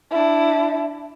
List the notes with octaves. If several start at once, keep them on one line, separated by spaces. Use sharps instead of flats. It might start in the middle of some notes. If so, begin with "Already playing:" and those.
D4 E4